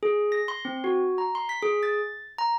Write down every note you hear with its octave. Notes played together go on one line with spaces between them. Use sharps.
G#4
A#6
C6
C4
F#4
A#5
C6
B6
G#4
A6
A#5